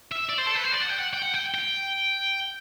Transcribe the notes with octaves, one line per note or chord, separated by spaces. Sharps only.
E5
D5
C5
A4
B4
C5
D5
F#5
G5
F#5
G5
F#5
G5
G5